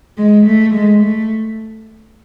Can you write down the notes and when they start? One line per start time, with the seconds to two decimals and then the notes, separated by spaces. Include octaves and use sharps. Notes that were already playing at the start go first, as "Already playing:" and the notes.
0.18 G#3
0.46 A3
0.75 G#3
1.03 A3